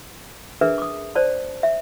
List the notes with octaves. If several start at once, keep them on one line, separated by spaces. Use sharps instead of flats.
D4 G#4 A#4 B4 E5
D6 D#6
C5 D5 A5
E5